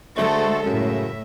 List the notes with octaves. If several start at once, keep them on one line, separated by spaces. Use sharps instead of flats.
D3 G#3 A3 F#4 A4 C5
F#2 A2 C#3 E5